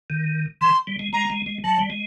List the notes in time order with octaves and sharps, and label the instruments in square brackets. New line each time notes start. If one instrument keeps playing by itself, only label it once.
[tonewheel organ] D#3
[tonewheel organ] E3 [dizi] C6
[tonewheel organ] G3
G#3
[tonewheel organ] G#3 [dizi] A#5
[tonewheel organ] G#3
G#3
[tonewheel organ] F#3 [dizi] A5
[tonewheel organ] G3
G#3